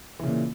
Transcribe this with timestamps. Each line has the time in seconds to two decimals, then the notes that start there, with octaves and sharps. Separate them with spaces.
0.19 E3
0.23 C#3
0.27 A#2